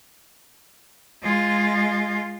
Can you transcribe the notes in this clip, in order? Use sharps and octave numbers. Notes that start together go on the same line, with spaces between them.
G#3 F4